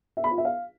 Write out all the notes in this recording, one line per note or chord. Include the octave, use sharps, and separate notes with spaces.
E5
B5
F4
E5
F5